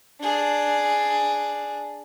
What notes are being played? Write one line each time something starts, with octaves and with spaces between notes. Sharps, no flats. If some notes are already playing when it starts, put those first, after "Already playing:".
D4 G#4